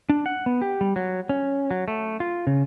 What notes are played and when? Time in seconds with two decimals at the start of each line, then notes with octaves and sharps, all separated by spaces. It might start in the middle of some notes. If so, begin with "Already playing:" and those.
0.09 D4
0.26 F#5
0.46 B3
0.62 G4
0.81 G3
0.96 F#3
1.29 C#4
1.71 F#3
1.88 A3
2.20 F4
2.47 C#3